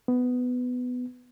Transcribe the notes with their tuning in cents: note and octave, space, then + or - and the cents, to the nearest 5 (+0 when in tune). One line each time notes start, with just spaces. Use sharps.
B3 +10